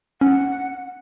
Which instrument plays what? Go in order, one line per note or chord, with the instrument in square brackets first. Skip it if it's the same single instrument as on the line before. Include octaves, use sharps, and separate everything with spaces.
[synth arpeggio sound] C#4 [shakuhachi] F#5